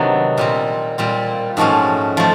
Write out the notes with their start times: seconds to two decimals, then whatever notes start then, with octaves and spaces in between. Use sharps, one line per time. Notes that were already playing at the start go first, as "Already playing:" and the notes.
Already playing: C3 D#3 F#3 B3 D4
0.38 A#2 G3 C4
0.98 A#2 G3 C4
1.57 G#2 F3 A3 C#4 F#4
2.17 F3 A3